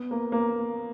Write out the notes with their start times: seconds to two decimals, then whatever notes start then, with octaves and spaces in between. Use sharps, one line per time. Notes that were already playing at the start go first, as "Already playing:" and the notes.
Already playing: B3
0.11 A#3
0.32 A#3